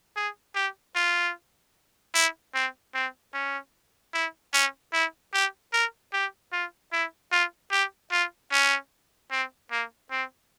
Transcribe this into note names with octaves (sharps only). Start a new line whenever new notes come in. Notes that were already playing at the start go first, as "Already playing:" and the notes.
G#4
G4
F4
E4
C4
C4
C#4
E4
C#4
E4
G4
A#4
G4
F4
E4
F4
G4
F4
C#4
C4
A#3
C4